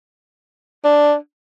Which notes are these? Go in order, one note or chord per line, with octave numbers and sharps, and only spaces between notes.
D4